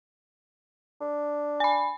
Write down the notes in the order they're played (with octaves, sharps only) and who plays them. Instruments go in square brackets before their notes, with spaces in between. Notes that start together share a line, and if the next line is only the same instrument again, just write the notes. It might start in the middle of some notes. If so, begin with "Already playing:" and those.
[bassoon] D4
[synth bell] G#5 B5